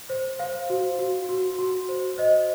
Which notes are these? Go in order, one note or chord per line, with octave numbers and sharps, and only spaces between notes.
C5
C5 F5
F#4
F#4
F#4
F#4
C5
C5 D#5